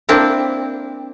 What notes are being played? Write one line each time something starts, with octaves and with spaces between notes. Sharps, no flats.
A#3 C4 D4 E4